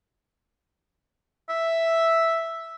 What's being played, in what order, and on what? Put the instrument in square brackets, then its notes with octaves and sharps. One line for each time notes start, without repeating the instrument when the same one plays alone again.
[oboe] E5